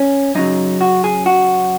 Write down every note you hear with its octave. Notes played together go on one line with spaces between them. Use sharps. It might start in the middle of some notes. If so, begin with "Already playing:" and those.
Already playing: C#4
F#2 C#3 F#3 D#4
F#4
G#4
F#4